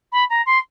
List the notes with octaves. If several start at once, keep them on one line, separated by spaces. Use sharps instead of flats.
B5
A#5
C6